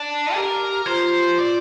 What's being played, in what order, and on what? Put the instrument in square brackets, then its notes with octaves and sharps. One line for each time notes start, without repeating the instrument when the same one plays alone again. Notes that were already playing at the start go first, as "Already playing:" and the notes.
Already playing: [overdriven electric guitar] D4
[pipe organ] G4 [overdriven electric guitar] A#4
[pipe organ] F4 [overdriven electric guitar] C5
[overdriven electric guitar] D5